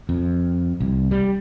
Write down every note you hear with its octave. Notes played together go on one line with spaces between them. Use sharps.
F2
C2
G3